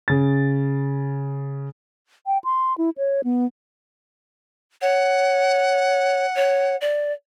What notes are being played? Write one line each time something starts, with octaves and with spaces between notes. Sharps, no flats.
C#3 A6
G5
C6
E4
C#5
B3
C#5 F#5
C#5
D5